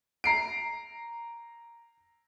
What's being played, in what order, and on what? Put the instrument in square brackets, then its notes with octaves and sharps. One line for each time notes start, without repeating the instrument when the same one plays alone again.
[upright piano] A#5 C7 D7